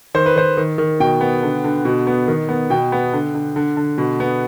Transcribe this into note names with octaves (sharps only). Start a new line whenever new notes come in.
D#3 C5
B4
D#3 C5
D#3
D#3
B2 G5
B3
D3
D3
B2
B3
D#3
B3
B2 G5
B3
D3
D3
D3
D3
B2
B3